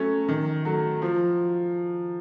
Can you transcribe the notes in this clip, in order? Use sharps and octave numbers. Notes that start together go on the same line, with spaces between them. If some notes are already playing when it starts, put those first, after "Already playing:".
Already playing: F#3 A3 C#4
D#3
F#3 A3
F3